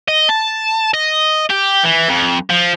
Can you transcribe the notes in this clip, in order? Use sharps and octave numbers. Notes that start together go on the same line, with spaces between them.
D#5
A5
D#5
G4
E3
F2
F3